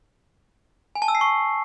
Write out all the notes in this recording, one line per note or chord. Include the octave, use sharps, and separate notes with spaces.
G#5
A5
E6
C7
C#6